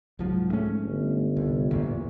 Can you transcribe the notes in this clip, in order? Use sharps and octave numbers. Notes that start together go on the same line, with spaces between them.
C2 G#2 F3 F#3
G#2 A3 C#4
G1
C2
A1 E2 A#2